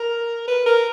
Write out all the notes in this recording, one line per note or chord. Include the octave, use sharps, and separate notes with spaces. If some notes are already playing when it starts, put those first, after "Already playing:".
Already playing: A#4
B4
A#4